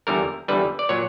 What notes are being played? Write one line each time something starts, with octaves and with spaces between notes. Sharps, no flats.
E2 D3 G3 A#4
E2 D3 G3 B4
D5
A#2 F#3 C#5